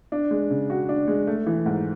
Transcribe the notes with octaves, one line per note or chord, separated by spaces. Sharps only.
D4
G#3
C#3
F#4
D4
G#3
A3
E3
G#2